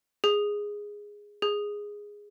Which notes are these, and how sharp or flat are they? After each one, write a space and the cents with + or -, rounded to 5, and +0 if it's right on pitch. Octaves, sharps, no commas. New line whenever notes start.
G#4 -10
G#4 -10